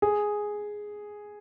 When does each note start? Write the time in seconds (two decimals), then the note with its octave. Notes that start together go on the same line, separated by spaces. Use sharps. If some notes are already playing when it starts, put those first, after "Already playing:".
0.02 G#4